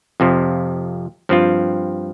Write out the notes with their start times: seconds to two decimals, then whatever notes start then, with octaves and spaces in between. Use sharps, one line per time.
0.20 F2 C3 F3
1.29 G2 F3 C4 F4